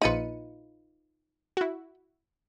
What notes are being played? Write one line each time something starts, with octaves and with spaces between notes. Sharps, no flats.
A#1 D#4 F4 B4 C#7 D#7
E4 F#4